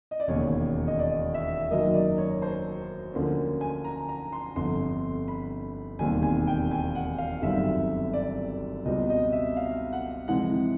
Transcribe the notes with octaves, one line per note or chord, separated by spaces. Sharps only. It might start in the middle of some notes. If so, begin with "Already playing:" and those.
D#5
D5
E1 D#2 C#3 C#5
D#5
D5
E5
F#2 D#3 F#3 A#3 D#5
D5
C#5
C5
D2 D3 F3 A#3 C#4
G#5
A#5
A#5
C6
G1 F2 D3 C6
B5
E1 D#2 D#3 G3 C4 G#5
G#5
G5
G#5
F#5
F5
G1 F#2 D#3 G3 C4 E5
D5
C#2 B2 G3 C4 D#5
D#5
E5
F5
F#5
F2 C3 E3 G#3 F#5